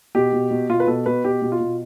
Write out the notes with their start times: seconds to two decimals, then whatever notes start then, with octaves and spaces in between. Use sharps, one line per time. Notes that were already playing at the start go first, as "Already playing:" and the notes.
0.15 B2 G4
0.33 B2
0.51 B2
0.70 B2 F4
0.80 B4
0.87 B2 A4
1.06 B2 B4
1.25 B2 G4
1.42 B2
1.52 F4
1.60 B2